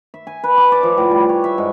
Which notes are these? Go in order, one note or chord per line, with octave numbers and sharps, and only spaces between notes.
E5
G#5
B4
D6
D5
F3
A2
G3
C#5
E5
G#2